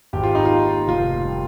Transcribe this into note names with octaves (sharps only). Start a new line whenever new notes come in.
G#1 G4
F4
D#4
F4
A#3
F1 F4
G3